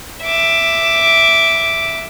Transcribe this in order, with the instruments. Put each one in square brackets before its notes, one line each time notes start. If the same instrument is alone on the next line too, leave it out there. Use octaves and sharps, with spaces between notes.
[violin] E5 D6